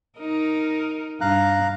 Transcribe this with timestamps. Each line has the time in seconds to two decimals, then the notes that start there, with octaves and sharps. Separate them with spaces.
0.19 D#4 A#4
1.21 G2 F5 A#5 F#6